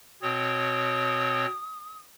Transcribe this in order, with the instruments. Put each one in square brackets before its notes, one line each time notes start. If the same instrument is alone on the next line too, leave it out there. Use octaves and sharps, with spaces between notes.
[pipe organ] B2 C4 C#5 [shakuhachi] D#6